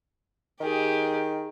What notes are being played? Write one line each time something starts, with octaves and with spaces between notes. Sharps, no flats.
D#3 G4 G#4